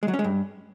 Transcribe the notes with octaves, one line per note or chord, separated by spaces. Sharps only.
G#3
F#3
C#4
G#3
G2